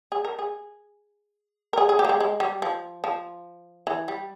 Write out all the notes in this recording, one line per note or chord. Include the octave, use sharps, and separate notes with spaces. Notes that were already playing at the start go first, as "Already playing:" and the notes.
G#4
A#4
G#4
A#4
G#4
G#4
G4
A#3
G#3
G#3
G3
F3
F3
E3
G3